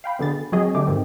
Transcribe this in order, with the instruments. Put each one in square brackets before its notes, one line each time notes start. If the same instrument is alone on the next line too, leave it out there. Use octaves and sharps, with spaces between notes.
[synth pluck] F5 G5 B5
B2 D3 G#4 A6
F#3 C4 F#4 G#4 D#5
D3 A3 G4 D6
G#2 D#3 C4